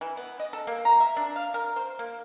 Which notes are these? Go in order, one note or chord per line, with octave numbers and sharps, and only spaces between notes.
E3
B3
D#5
A4
A#3
A#5
E5
D4
F5
A#4
C5
A#3